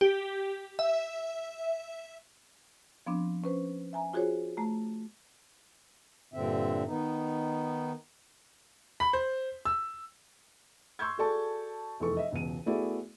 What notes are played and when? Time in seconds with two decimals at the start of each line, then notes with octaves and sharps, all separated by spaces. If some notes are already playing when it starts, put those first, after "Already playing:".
0.01 G4
0.79 E5
3.06 F3 B3 C4 D4
3.44 C#4 B4 C5
3.93 E5 G#5 A#5
4.14 F4 F#4 G#4 C5 C#5
4.57 A3 A#5
6.34 G2 A#2 D3 C4 E5
6.86 D#3 B3 D#4
9.00 B5
9.13 C5
9.65 E6
10.99 C6 C#6 E6 G6 G#6
11.18 F#4 G#4 A4 D5 A5 C#6
12.00 F1 E2 A4 C#6
12.17 D#5 E5
12.31 E1 C#2 B2 D#7
12.66 A3 B3 E4 F#4 G#4 D5